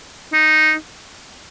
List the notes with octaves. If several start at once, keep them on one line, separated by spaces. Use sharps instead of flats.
D#4